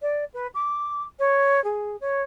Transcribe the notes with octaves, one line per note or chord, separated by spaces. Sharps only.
D5
B4
D6
C#5
G#4
C#5